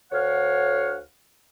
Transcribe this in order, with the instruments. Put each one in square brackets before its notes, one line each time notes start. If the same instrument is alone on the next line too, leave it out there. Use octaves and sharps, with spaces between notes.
[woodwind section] D2 C#5 F5 F#5